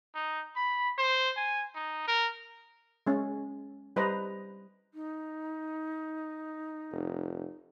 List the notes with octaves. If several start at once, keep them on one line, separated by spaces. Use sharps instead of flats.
D#4
B5
C5
G#5
D#4
A#4
G#3 C#4 C#5
G3 B4 C5 D#5 A#5 B5
D#4
F1